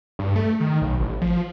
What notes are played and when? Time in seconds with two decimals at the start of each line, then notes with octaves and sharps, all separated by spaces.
0.19 G2
0.36 A3
0.60 D#3
0.82 B1
1.00 A1
1.22 F3